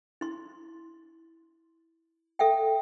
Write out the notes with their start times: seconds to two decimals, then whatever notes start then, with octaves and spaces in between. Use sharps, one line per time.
0.21 E4 C6
2.39 A4 E5 F#5 G5